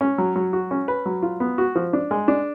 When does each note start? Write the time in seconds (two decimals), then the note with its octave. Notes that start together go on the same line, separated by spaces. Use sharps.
0.01 C#4
0.18 F#3
0.36 F#3
0.53 F#4
0.71 C#4
0.88 B4
1.06 F#3
1.23 F4
1.40 B3
1.58 F#4
1.76 F3
1.93 D4
2.11 G#3
2.28 D4